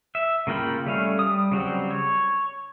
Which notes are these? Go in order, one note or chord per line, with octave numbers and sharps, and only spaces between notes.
E5
C#3 A#3 F4 G5 B5
G3 A3 C#4 F5
G3 D#6
C#3 F#3 G3 C4
C#5